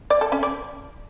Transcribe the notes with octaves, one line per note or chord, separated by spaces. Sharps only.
D5
A4
C#4
D5